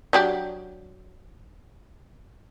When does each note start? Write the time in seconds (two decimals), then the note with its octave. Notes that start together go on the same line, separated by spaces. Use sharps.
0.13 F#3 D4 G4